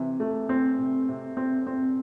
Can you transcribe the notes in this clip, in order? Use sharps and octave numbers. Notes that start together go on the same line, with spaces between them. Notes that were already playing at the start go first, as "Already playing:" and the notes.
Already playing: C3 E3
A3
C4
C3
C3
C4
C4